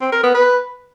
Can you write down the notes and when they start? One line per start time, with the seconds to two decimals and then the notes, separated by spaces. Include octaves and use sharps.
0.01 C4
0.12 A#4
0.23 B3
0.34 B4